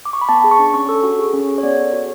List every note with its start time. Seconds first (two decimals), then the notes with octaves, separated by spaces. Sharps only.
0.05 D6
0.13 C#6
0.21 B5
0.29 B3 A5
0.44 G#4
0.51 C#6
0.59 D4
0.74 C#4 C#6
0.89 A4
1.03 F#4
1.19 G#4
1.34 C#4
1.48 G#4
1.58 C#5
1.63 B3 D5
1.78 A4
1.93 F#4